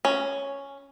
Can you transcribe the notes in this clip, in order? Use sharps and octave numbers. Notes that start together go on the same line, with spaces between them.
C#4